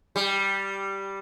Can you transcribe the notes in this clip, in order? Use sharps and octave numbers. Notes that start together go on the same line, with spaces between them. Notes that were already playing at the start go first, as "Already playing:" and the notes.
G3